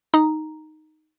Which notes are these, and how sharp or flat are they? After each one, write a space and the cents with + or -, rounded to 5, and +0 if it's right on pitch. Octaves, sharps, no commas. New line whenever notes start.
D#4 +0 A#5 +0